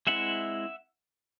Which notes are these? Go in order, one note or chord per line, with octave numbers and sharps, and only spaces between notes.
G#3 C4 E4 E5 F#5